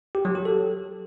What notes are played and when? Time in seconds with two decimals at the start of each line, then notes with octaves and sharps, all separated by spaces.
0.15 G4
0.25 F#3
0.35 G4
0.45 A4